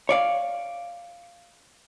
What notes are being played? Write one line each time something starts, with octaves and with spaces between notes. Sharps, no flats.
C#5 D5 F5